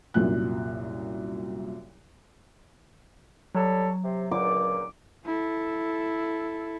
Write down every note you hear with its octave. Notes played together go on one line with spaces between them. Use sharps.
C2 F#2 A#2 F#6
F#3 G3 A4 C#5
C3
C#2 A#2 D6
E4 A4